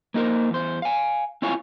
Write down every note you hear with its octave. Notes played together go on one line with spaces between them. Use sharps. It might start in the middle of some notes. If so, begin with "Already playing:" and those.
A#3 D#4 F#4 A#4 C5
E2 C5
F5 G#5
C4 E4 F4 C#5 F5 G#5